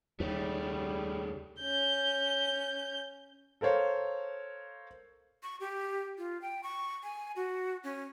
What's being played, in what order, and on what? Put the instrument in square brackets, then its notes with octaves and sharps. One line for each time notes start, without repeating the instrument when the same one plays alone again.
[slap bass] D#2 [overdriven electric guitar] C#3 A3 [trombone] G3
[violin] C#4 G6
[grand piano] A4 A#4 C5 C#5 F5
[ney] C#6
G4
F4
G5
C#6
G#5
F#4
C#4